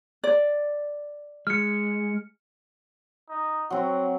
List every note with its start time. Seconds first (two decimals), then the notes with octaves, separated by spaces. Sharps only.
0.24 D5
1.47 G#3 F6 C#7
3.29 D#4
3.70 F#3 C4 F#4